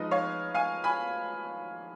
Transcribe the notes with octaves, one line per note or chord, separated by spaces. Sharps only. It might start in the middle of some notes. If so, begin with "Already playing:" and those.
Already playing: F3 G#3 D#4 B4 D#5
C#5 F5
F5 G#5
G#5 B5